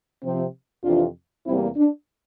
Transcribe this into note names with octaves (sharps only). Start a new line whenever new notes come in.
C3 F3 C4
F2 C3 E3 D4 F4
E2 C3 G3 A#3 C4 E4
D4